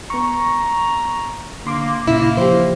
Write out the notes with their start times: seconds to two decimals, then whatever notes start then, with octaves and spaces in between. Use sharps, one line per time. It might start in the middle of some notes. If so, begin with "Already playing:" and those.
0.10 B3 A#5 C#6
1.66 D3 A#3 C6 D6
2.07 A#2 C#3 A#3 E4
2.37 E3 F3 G4 C5